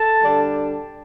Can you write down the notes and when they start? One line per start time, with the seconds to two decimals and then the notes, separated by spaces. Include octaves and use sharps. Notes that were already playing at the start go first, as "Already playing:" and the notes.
Already playing: A4 A5
0.23 D3 G3 D4